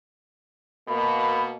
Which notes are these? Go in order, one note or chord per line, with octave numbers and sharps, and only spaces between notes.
B2 A#3 B5